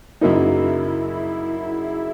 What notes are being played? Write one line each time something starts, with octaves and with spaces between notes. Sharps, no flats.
F#2 C#3 F#3 A#3 D#4 E4